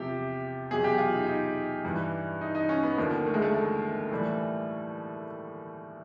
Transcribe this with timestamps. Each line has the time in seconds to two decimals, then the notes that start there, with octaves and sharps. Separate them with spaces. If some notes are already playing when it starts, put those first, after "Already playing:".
Already playing: E2 C3 F3 G4
0.71 E2 B2 F#3 G#4
0.84 G4
0.98 F4
1.14 D#4
1.27 D#4
1.85 G2 E3 G3
2.41 D#4
2.55 D#4
2.69 C#4
2.83 B3
2.97 D#2 D3 F3 A#3
3.26 A3
3.34 G#3
3.42 A3
3.54 A3
4.11 A2 E3 G3